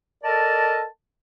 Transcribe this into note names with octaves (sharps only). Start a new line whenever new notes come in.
A4 A#4 D5 D#5 A5